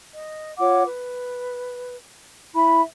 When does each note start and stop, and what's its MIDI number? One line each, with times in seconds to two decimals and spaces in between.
0.13 0.50 75
0.58 0.83 65
0.58 0.83 73
0.58 0.83 78
0.58 0.83 86
0.84 1.95 71
2.54 2.82 64
2.54 2.82 76
2.54 2.82 83